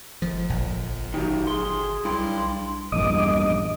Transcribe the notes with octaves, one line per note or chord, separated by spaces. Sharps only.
G1 F3
A#1
D#3 F#3 G4
G#4 C6
B1 G2 E4 C6
A#1 E2 G2 D#5 D6 D#6